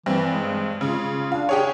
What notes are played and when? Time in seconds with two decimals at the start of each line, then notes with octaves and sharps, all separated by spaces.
0.06 G2 E3 C4
0.30 G#3
0.81 C#3 F4
1.32 D4 F5
1.49 G4 G#4 C#5